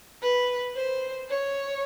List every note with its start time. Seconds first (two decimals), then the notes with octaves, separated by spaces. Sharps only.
0.22 B4
0.76 C5
1.30 C#5